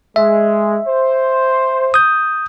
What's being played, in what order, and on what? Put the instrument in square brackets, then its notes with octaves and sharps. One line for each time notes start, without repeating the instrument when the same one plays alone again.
[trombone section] G#3 [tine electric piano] E5
[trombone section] C5
[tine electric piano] D#6 G6